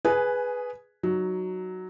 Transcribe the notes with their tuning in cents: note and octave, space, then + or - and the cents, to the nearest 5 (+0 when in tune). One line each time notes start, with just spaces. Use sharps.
G#4 +0 B4 +0 G#5 +20
F#3 +0 D#4 +0